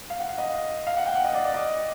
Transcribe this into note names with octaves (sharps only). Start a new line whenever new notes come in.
F5
F#5
F5
D#5
F5
F#5
G5
F#5
D#5
D5
D5
D#5